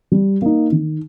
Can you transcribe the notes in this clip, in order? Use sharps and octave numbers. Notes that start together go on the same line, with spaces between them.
G3
A#3 D#4
D#3